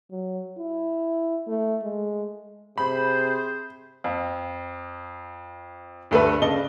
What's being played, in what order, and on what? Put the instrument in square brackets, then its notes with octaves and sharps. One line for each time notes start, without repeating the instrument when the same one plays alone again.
[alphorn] F#3
E4
A3
G#3
[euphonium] C3 [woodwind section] G#4 C5 [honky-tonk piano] B5
[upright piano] F2
D2 G2 A3 D4 A4 B4
C#3 D5 D#5 A5 G7